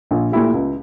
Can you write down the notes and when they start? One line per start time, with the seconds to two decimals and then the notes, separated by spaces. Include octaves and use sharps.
0.11 A#1
0.32 A#2 A3 E4 G4
0.54 C#2